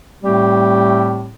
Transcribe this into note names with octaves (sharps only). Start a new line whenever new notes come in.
A2 G3 A3 C4 G4